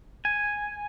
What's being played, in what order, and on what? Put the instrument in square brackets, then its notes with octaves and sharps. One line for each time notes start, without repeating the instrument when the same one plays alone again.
[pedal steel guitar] G#5